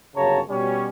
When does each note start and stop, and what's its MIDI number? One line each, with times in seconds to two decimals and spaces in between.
0.16 0.39 31
0.16 0.39 42
0.16 0.39 49
0.16 0.39 73
0.16 0.39 81
0.16 0.39 82
0.49 0.89 47
0.49 0.89 55
0.49 0.89 61